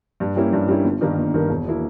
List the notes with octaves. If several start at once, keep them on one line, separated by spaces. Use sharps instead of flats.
G2
G3 A#3 C#4 E4
G2
G3 A#3 C#4 E4
G1
G2 D#3 A#3
G1
G2 D#3 A#3
E1
B2 A#3 E4